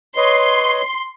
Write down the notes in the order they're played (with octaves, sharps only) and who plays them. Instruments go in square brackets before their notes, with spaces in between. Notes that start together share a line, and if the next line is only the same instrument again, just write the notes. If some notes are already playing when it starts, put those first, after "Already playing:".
[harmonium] B4 C#5 D#5 [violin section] C6